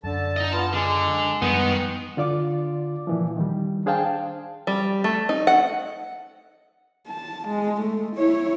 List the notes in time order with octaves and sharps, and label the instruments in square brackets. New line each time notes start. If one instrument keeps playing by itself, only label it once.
[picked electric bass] F#2 [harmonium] D3 A5
[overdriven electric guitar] D#4 D#5
[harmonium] B3 F4 [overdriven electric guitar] A5
[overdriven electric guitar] D3 [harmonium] G#3
[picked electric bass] F#2 F3 G3 [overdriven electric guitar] D#3 D#4 [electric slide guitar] B3
[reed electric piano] D3 F4 D5 D6
A#2 E3 F3
D#3 G3
D4 G#4 C5 F5 G5 A5
[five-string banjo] G3
A3
D#4
F#5
[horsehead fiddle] A5
G#3
A3
E4 C#5